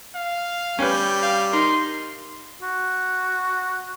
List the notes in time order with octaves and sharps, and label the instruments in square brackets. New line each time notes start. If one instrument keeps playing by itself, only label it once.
[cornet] F5
[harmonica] G3 [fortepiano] C#4 B4 [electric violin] G5
[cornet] F5
[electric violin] D#4 C6 [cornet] A#4
[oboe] F#4